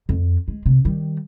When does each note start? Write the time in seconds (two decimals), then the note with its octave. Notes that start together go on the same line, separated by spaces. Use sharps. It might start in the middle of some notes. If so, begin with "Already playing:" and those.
0.09 F2
0.48 G#3
0.66 C3
0.85 D#3 G3